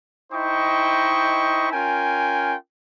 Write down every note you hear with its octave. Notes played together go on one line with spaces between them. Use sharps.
D#4 E4 C5 D#5 G5 C#6
C#4 F4 A#4 G5 G#5